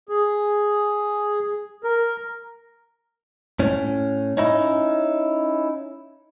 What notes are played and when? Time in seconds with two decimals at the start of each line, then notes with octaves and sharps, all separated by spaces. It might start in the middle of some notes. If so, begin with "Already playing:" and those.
0.09 G#4
1.84 A#4
3.59 A2 C#4
4.37 C#4 D#4 E4